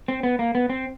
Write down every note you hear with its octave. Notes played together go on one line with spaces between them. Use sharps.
C4
B3
A#3
B3
C4